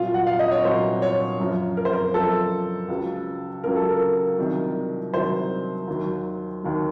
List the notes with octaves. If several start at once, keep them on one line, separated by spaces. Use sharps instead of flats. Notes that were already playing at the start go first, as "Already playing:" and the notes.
Already playing: C2 A#2 F#3 F4
F#5
F5
D#5
C#5
C2 A#2 F#3 C5
C#5
F#2 F3
A#4
C5
A#4
F#2 F3 A4
C#2 C#3 F#3
C#2 C#3 F#3 A#4
A4
A#4
C2 C3 D#3 F#3
C2 C3 D#3 F#3 C5
D#2 D#3 F#3
D#2 D#3 F#3